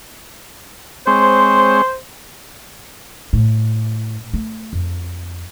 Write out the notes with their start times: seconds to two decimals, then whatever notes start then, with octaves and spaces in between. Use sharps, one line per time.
1.07 G#3 C4 C5 C#5
3.33 A2
4.34 A3
4.73 F2